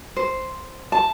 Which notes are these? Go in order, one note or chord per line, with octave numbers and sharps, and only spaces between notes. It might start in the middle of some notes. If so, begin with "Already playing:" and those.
C5
A5